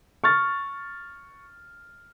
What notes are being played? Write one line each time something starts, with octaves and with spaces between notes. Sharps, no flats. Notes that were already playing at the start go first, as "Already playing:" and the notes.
C#6 F6 A6